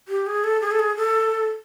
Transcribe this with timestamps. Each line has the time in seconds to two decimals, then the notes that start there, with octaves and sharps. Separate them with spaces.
0.08 G4
0.26 G#4
0.44 A4
0.61 G#4
0.71 A4
0.79 G#4
0.97 A4